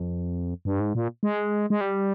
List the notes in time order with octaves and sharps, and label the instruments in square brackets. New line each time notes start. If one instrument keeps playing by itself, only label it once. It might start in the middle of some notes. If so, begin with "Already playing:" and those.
Already playing: [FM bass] F2
G2
G#2
A#2
G#3
G#3
G3